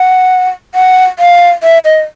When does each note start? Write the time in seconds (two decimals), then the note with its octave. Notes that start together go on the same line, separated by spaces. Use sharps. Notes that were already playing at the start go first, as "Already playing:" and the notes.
Already playing: F#5
0.75 F#5
1.19 F5
1.63 E5
1.85 D#5